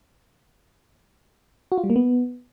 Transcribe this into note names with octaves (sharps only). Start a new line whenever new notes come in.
F#4
F4
G3
A#3
B3